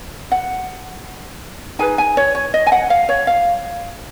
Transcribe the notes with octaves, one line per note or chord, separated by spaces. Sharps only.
F#5
D#4 G#4 B4 G#5
G#5
C#5
C#5
D#5
G#5
F#5
F5
C#5
F5